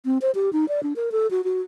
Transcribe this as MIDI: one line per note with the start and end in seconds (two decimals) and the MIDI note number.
0.05 0.18 60
0.22 0.31 72
0.35 0.52 67
0.53 0.68 63
0.68 0.83 74
0.83 0.93 62
0.96 1.10 70
1.12 1.29 69
1.31 1.44 66
1.44 1.62 66